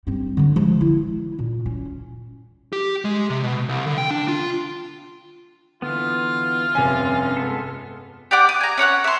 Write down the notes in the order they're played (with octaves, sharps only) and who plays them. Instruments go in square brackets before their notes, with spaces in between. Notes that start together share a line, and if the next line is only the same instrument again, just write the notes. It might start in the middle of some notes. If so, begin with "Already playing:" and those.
[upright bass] G2 C4
D3 F#3
F3 G#3
E4
A#2
C#4
[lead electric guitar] G4
G#3
C3
B2
C2
D3
G5
D4
F4
[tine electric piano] D3 [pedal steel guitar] E3 B3 [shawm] F4
[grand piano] F1 G#5 [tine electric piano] G2 C3 C4 [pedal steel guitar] C#4
[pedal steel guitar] G#3 B3 A4
[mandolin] G4 D5 F#5 D6
D#6
G#5 A#5
C#4 C#5 F#5 F#6
E5 C6